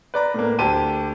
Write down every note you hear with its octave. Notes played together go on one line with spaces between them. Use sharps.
B4 D5 A#5
A2 A#3
D2 G4 A5 D#7